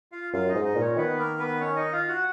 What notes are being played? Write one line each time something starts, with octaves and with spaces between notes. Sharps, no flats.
F4 F5
F#2 F4 F5
D#4 D#5
G#2
D#4 D#5
A#2
C#4 C#5
D#3 B3 B4
A#3 A#4
B3 B4
C#4 C#5
D#4 D#5
F4 F5
F#4 F#5